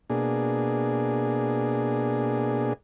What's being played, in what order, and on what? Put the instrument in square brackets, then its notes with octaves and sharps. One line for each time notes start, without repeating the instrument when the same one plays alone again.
[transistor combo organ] B2 A#3 D4 G#4